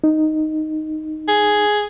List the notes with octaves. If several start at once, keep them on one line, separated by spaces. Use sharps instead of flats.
D#4
G#4